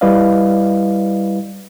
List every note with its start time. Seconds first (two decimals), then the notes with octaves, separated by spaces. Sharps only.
0.01 G3 E4 B4 D5 D#5 F5